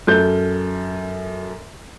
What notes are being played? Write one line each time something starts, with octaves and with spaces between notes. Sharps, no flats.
F#2 A4 G6